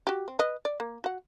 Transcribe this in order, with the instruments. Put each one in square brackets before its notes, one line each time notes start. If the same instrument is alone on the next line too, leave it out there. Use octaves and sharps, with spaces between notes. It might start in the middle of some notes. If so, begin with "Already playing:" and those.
[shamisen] F#4 G4
C4
B4 D#5
D5
A#3
F#4 F#5